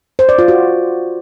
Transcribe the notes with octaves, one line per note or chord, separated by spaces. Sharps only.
C5
D5
F4
F#4